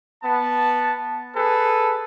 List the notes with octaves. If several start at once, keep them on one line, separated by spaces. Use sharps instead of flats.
B3 A5
G#4 A4 B4